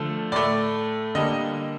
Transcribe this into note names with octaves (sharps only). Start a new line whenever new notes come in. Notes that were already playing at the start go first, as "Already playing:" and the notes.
Already playing: D3 F3 A3
A2 A3 D5
D3 G3 A#3 D#5